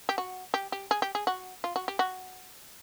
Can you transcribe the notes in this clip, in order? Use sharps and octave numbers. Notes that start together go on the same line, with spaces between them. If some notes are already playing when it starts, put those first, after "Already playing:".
G4
F#4
G4
G4
G#4
G4
G#4
F#4
F4
F#4
G4
F#4